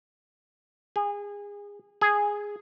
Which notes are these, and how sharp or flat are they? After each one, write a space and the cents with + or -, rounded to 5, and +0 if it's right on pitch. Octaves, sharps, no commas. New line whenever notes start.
G#4 -25
G#4 -5